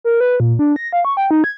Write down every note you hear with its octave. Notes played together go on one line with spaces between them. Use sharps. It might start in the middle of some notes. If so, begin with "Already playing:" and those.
A#4
B4
A#2
D4
A#6
F5
C#6
G5
D#4
G#6